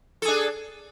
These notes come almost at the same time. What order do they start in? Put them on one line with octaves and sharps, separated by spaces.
A4 G#4 D4